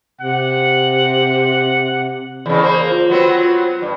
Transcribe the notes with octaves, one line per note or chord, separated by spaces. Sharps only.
C3 F#5
E2 C#3
A#3 C5
F4
F#3 B3 C4
G2